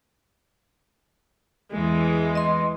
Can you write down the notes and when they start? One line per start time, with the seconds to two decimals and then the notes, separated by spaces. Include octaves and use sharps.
1.72 E2 E3 G#3
2.35 D#5 C6